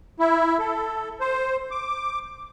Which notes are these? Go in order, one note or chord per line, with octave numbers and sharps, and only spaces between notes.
E4
A4
C5
D6